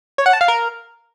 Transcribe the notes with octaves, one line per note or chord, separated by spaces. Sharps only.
C#5
F#5
A5
F5
A#4